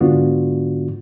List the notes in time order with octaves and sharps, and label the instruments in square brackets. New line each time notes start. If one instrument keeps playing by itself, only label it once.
[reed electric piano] G#2 D3 B3 D4 F4 F#4